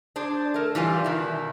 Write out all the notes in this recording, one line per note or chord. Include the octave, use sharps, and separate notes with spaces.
D4 G#4 C5
A3 A#4
E3 G3 F4 G#5
B2 D#3 E4